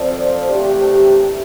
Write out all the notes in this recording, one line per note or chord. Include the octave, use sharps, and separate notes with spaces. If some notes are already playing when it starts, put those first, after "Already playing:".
Already playing: F3 C4 F4 A4 D5
C3 E3 A3 D4 G4